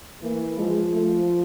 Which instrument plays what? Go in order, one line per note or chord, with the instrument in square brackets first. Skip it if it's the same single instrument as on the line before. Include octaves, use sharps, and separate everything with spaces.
[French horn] E3 [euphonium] A#3
[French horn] F3 [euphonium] G#3
[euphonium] A3